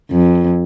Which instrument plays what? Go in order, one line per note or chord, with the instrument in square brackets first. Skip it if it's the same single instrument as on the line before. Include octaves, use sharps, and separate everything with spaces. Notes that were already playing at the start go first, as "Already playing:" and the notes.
[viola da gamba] F2